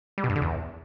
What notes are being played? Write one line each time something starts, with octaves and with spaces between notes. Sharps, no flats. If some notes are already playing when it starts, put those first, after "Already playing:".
G3
B2
G2
D3
E2